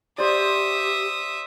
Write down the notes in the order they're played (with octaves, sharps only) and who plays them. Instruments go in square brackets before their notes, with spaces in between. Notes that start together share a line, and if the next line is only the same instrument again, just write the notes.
[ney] G4 [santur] C5 D5 [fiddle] E5 D#6